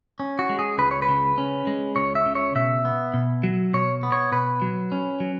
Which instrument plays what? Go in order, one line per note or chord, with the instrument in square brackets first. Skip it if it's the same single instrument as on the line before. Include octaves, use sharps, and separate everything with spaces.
[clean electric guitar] C#4
F#4
G#3
G#4
C#2 B4
C#5
B4
C#3
C#4
G#3
C#2 C#5
E5
C#3
C#5
B2 E5
B3
B2
F#3
B2 C#5
B3
C#5
B2 B4
F#3
C#4
F#3